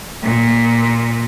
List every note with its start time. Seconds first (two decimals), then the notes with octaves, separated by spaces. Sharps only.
0.23 A#2